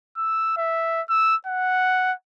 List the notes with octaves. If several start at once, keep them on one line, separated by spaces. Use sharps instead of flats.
E6
E5
E6
F#5